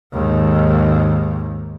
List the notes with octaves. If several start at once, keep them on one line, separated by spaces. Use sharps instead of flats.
D#2 G#2